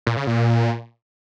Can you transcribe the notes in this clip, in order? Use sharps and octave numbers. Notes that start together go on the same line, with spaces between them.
A#2
C#3
A#2